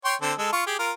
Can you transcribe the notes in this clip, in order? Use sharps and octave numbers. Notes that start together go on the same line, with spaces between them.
C#5 G5 C6
D3 C4 A4
G#3 A4
F4 C#6
G4 G#4
F4 A#4